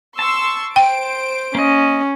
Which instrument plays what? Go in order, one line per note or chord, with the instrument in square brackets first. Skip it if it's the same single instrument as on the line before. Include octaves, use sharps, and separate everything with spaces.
[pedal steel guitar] A5 [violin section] C6 C#6 E6
[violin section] C5 D7 [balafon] G5
[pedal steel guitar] A#3 D#5 [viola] C#4